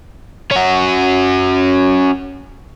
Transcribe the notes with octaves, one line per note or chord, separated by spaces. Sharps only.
C#4 F#4